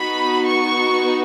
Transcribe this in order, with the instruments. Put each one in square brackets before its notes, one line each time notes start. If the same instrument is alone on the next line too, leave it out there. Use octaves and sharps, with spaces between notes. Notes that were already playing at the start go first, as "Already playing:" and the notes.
Already playing: [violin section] B3 D#4 F#4 B5
C#6